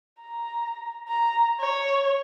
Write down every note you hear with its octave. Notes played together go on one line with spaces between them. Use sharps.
A#5
A#5
C#5